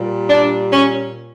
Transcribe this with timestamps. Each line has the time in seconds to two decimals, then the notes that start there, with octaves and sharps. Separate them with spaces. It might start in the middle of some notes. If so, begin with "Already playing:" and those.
Already playing: A#2 G3
0.29 D4
0.71 C#4